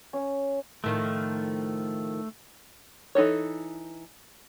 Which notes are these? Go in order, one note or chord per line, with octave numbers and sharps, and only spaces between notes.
C#4
A2 D#3 F3 A3
E3 D#4 A4 C#5